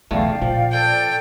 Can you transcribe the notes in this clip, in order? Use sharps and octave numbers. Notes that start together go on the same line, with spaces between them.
B1 E2 C#3 A3 D5 F5 G5
A#2 F3
A4 D5 G5